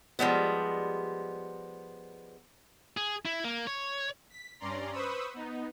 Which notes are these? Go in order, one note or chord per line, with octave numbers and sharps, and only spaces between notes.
F3 G3 G#3 B3
G#4
E4
A#3
C#5
B6
G2 C#4 D5 A#5 C6
B4 C5 B5 C#6 D#6 E6
B3 D#4